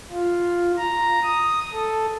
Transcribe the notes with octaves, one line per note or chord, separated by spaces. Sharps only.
F4
A#5
D#6
A4